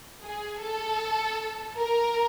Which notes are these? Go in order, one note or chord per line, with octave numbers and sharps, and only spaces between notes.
G#4
A4
A#4